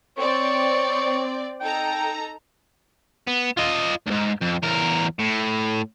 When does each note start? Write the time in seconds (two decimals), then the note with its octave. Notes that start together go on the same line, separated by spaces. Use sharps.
0.17 C4 C#5 D5
1.61 D#4 A4 G5 A#5
3.28 B3
3.57 F4 D#5
4.07 D2 G#2
4.42 F2
4.63 E2 A#4
5.19 A2